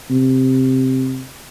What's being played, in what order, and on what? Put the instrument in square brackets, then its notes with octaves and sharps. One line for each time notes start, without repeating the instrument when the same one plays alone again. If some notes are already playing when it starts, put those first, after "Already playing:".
[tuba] C3